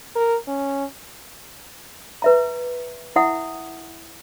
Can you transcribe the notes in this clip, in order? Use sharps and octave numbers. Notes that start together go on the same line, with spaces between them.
A#4
C#4
B4 E5 A#5
E4 E5 F#5 D#6